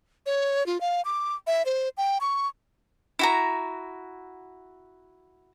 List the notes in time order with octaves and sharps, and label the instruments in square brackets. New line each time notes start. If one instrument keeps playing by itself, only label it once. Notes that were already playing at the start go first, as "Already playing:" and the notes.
[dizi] C#5
F4
F5
D6
E5
C5
G5
C#6
[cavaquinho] E4 F#4 A#5